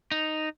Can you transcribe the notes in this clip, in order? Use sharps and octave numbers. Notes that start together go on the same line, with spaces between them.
D#4